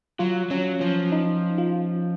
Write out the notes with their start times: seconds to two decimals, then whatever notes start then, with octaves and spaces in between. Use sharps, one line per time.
0.19 F#3 F4
0.50 F#3 C#4
0.80 F3 C#4
1.12 D#4
1.58 F4